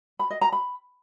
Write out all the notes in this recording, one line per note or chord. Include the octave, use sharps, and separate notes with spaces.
B5
D#5
A#5
B5